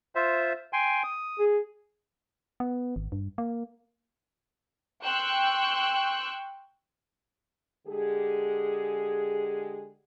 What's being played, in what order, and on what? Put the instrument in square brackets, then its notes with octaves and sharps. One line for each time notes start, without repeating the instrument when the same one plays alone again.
[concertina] F4 C5 E5
G5 G#5 C6
D#6
[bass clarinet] G#4
[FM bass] B3
G#1
G2
A#3
[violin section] G5 C6 C#6 E6 F#6 G6
[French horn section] D3 G#3 G4 G#4